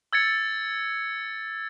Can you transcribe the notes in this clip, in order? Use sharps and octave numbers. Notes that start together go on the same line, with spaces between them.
E6 G#6 A6 C#7